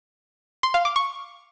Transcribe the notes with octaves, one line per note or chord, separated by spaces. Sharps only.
C6
F5
D6
C#6